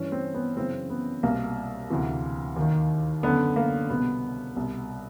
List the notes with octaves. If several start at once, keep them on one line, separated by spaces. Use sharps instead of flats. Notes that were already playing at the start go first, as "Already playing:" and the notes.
Already playing: G2 E3 C#4
C4
B3
F#2 C#3 E3 C4
B3
C2 B2 A#3
D2 C3 E3
D#2 D#3
F#2 D3 B3
A#3
C2 B2 B3
C2 B2